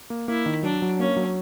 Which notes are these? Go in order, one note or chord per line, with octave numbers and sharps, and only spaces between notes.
A#3
A#3 E4
D#3
F#3 D4
F#3
A#3 C#4
F#3